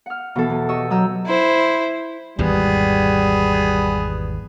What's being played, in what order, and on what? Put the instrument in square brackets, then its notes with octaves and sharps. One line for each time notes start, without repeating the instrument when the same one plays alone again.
[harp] F#5 F6
B2 E3 A4
E2
G4 D#5 C#6 E6
F#3 D#5 A#5 E6 G6
[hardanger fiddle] E4 C5
[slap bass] G#1 E2 G#2 [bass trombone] G3 [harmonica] B3 G#4